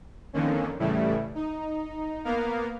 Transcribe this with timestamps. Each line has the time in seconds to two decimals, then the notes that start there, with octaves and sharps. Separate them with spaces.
0.33 F2 D3 D#3 A#3 C#4
0.79 A2 C#3 E3 G3 A3 E4
1.35 D#4
2.24 A#3 B3 A#4 F5